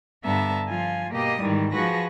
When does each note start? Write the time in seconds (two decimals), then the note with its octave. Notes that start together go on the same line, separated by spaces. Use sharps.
0.24 G2 D3 B3 E5 A5 A#5
0.68 F3 F4 G#5
1.11 B2 A#3 G4 D#5 D#6
1.42 G#2 D#3 E3 G3
1.72 F3 F#4 G#4 B4 C#6 A#6